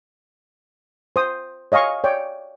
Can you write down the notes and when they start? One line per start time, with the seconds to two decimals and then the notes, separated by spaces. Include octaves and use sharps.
1.16 C5 D#6
1.72 C#5 D#5 F5 G#5 C#6
2.04 C#5 D5 G5